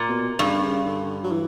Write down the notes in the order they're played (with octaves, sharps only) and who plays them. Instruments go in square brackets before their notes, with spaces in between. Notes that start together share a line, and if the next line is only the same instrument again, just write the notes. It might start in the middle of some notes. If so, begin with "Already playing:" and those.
Already playing: [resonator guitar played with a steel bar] A#2
[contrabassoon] B2
[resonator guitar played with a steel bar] G2 [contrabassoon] C#3
[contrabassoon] D3
C#3
D3
F#3
E3